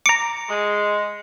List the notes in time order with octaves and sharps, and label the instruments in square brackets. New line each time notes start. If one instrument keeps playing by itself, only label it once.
[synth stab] A#5 D6 [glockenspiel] C#7
[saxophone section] G#3